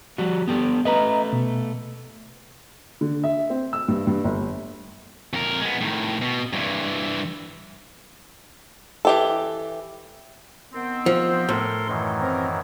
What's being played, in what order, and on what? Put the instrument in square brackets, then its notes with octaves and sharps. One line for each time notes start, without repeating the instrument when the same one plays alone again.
[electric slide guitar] F3 G3 F#4
B3 G4 A4
[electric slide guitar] A3 B4 [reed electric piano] D#5 A#5
[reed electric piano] B2
[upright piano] D3
E5
C4
E6
G2
G2
G1
[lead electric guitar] F2 A#4
G#3 B3
A2 D#3
B2
G2 E3
[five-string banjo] E3 G4 A4
[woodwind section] D#3 B3 C4
[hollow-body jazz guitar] F3
[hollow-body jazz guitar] A2 [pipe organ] A4 A#4 C6
[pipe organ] F#2 D#3 E3
[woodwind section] C4 A#4